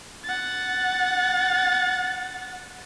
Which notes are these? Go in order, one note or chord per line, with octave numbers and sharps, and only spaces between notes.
F#5 A6